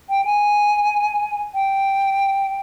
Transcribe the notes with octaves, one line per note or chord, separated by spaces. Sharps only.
G5
G#5
G5